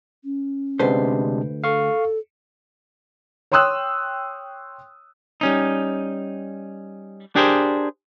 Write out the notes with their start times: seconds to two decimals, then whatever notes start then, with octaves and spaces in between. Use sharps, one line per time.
0.24 C#4
0.79 D2 C3 G#3 D4 B4 C5
1.64 A4 F5 C#6
3.52 C#5 G5 C6 D#6 E6 F#6
5.41 G3 C#4 D#4
7.35 D4 G4 G#4 A#4 C5